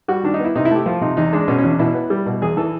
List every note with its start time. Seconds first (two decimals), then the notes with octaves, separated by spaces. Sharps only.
0.08 G3 F#4
0.24 D#3 D4
0.34 D#4
0.39 B3
0.45 E4
0.55 C3 D#4
0.65 E4
0.71 A3 G4
0.86 F3 F4
1.01 C3 D#4
1.17 E2 D#4
1.33 G#3 D4
1.48 B2 C#4
1.58 E2 C#4
1.69 D4
1.79 B2 E4
1.95 B3
2.10 G3
2.26 B2
2.41 E2 G#4
2.57 E3 A4